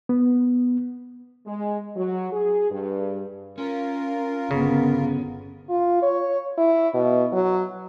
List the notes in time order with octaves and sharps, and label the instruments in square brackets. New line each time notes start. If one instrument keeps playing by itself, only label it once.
[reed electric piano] B3
[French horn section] G#3
F#3
G#4
G2
[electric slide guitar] C#4 [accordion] F4 A#4
[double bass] G1 B3 [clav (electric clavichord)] C#3
[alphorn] F4
C#5
E4
B2
F#3